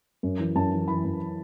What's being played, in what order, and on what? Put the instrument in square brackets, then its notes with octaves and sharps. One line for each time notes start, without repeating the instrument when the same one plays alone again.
[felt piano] F#2
E3
F#2 A5
E3
E3 B5
F#2